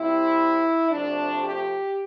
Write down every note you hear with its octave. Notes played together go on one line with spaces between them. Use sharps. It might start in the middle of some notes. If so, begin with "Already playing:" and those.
Already playing: C3 G3 C4 E4
C3 F3 A3 D4
G4